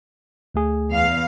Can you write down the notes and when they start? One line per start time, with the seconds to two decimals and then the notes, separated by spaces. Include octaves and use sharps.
0.55 D2 A3 G#4
0.91 E2 F5